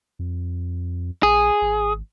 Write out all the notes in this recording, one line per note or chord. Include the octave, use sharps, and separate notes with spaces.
F2
A#1 G#4
G#1